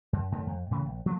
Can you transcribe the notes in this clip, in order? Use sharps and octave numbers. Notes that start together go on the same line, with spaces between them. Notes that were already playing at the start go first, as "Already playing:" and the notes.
F#2
F#2 D#3 G#3 A3
F2
A2 C#3 E3 A3
A#1
F3 F#3 A3 A#3